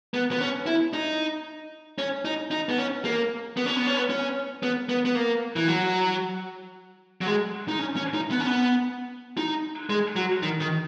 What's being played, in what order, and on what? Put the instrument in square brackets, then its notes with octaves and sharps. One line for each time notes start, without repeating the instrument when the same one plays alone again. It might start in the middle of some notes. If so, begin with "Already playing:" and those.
[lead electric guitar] B3
B3
C#4
E4
D#4
C#4
D#4
D#4
B3
C#4
A#3
B3
C#4
B3
C#4
B3
C#4
B3
B3
B3
A#3
E3
F#3
F#3
G#3
D#4
C#4
C#4
D#4
B3
C#4
B3
D#4
G#3
F#3
D#3
D#3